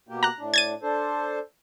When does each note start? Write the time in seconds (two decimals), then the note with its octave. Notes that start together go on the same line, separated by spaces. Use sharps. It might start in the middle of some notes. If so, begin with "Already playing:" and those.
0.09 B2 A#3 G4
0.23 A#5 F#6
0.39 A2 D4
0.54 G#6 A6 D#7
0.82 D4 A4 C5